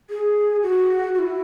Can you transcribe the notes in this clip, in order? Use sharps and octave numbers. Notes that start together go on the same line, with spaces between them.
G#4
F#4
F#4
E4